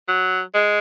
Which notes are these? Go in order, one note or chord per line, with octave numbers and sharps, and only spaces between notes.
F#3
G#3